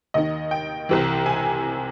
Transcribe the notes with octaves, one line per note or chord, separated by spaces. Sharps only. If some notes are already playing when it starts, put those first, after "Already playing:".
D#2 D#3 D#5
G5
C2 C3 E3
G#5